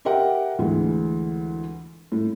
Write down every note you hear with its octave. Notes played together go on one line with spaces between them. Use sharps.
G4 A#4 E5 F#5 G5
D2 E3 G#3
A2